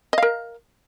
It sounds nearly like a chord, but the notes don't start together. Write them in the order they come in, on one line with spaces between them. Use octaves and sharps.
D#5 F5 A#4